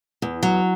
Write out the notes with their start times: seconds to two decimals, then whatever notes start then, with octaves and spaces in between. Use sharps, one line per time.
0.22 E2
0.43 F#3